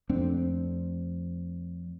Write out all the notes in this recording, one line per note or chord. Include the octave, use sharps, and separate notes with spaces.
F2 A3 C4 D4